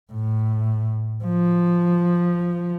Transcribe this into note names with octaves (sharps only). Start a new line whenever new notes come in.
A2
F3